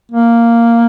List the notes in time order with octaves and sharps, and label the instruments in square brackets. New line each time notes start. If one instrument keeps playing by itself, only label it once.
[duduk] A#3